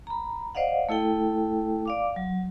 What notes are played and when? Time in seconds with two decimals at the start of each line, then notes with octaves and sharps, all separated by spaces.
0.07 A#5 B5
0.55 C5 D5 D#5 F5 F#5
0.89 A3 E4 A4 G5
1.85 D5 F5 D6
2.16 F#3